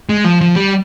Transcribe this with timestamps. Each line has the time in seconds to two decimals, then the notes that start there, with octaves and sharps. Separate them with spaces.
0.09 G#3
0.24 F3
0.41 F3
0.56 G3